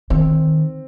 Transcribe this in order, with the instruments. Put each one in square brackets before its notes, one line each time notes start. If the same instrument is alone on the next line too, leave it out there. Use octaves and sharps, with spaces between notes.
[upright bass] D#3 [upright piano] C4